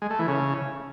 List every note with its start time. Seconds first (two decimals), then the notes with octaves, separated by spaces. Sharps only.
0.02 G#3
0.10 A3
0.19 E3
0.28 C#3